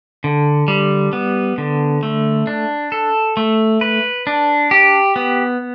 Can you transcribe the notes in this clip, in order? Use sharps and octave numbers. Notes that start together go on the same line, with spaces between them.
D3
G3
B3
D3
A3
D4
A4
A3
B4
D4
G4
B3